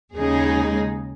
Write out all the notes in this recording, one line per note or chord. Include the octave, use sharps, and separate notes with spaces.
D#2 C#3 G#3 D#4 G#4